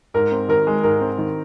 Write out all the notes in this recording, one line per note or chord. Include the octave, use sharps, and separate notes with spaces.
G#2 A#4
C4
D#3 A#4
G#3
G#2 A#4
C4
D#3